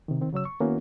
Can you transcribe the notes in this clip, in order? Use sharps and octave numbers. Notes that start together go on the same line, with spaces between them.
C3 D#3
D#3 C4
C#3 F#3 C#5 E6
C#6
D#3 A#3 B3 C#4 E4 F#4